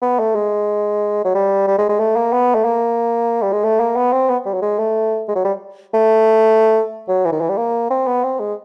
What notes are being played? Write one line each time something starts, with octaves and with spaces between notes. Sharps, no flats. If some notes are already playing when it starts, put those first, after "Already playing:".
B3
A3
G#3
F#3
G3
G3
G#3
G#3
A3
A#3
B3
A3
A#3
G3
G#3
A3
A#3
B3
C4
B3
G3
F#3
G#3
A3
G#3
F#3
G3
A3
F#3
E3
D#3
E3
G3
A#3
C4
B3
C4
G#3